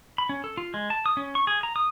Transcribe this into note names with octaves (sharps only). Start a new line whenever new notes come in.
B5
C#4
A4
F4
G#3
A5
D#6
C#4
C#6
G#4
A#5
D#6